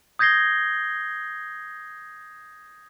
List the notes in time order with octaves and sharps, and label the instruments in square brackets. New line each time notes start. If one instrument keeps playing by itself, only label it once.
[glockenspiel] D#6 G6 G#6 A#6 C7 G7